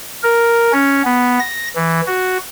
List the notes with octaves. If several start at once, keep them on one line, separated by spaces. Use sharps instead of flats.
A#4
C#4
B3
A#6
E3
F#4